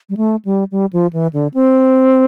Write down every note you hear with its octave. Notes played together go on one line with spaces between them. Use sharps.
G3
A3
G3
G3
F3
E3
D3
C4